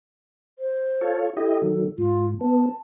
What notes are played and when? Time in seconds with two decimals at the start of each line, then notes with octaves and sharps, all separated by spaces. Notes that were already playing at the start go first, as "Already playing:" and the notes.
0.59 C5
1.01 F4 A4 C#5
1.37 E4 G4 A4 D#5
1.62 D#3 F#3
1.98 G#2 F4
2.41 B3 A5